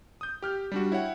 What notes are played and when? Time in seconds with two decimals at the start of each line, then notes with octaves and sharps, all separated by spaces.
0.21 D#6 G6
0.42 G4 F6 G6
0.72 G3 D4 F#4
0.92 E4 C#5 F#5 G5